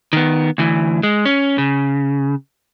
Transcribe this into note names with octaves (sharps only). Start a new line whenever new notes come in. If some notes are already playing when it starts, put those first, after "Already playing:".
D#3 B3
D2 E3
G#3
C#4
C#3